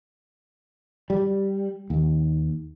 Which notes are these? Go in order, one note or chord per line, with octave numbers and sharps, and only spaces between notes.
G3
D#2